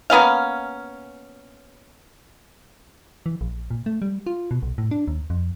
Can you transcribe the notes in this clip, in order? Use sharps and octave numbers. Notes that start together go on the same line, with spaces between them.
A#3 B3 C#4 F5
E3
A#1
A#2
A3
G3
F4
B2
B1
A2
D4
D#2
F2